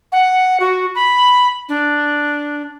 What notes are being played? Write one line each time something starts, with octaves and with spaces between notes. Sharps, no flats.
F#5
F#4
B5
D4